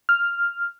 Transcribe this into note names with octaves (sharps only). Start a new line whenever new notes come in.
F6